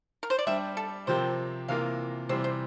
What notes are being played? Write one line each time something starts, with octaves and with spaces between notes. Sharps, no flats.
A#4
C5
D5
G3 D4 G4 E5
A4
C3 F3 C4 G4 A#4 C5
C3 E3 A#3 F4 A#4 F5
C3 E3 G3 C4 C5
C5